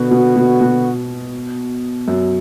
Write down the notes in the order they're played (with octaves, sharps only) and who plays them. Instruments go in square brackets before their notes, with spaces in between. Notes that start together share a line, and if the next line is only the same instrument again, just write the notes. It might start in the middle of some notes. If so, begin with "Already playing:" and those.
Already playing: [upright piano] B2 [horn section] D3 B3 F#4
[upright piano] B2
B2
B2
F#2 F#3